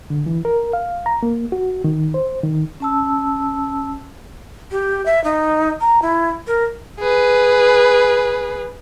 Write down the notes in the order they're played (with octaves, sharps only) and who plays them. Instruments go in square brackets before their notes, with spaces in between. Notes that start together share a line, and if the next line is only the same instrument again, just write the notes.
[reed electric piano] D3
E3
A#4
F5
A#5
A#3
F#4
D#3
C5
D#3
[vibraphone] C#4 A5 E6
[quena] G4
E5
D#4
A#5
E4
A#4
[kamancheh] G#4 B4